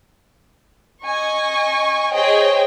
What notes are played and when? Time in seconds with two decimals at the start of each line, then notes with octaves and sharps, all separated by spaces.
1.05 D#5 G#5 C#6
2.14 G#4 C5 C#5 D#5 G5